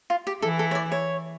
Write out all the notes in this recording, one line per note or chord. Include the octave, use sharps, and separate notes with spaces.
F4
G4
E3 E4 A4
A4
C#5
D5
C#5